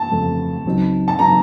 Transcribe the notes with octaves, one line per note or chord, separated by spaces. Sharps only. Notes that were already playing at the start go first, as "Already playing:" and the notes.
Already playing: A5
F2 C#3 F3 A3 C4
C#2 C#3 F#3 C4 D#4
A5
C#3 F#3 C4 D#4 A#5